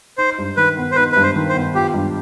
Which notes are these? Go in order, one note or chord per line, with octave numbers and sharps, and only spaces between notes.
D#4 C5
G2
D#3 B4
B3
C5
D#4 B4
G2 B4
C5
D#3
C5
B3
F4 G4
G2